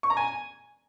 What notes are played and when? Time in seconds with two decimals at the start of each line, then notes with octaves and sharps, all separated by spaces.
0.03 C#6
0.10 A#5
0.17 G#5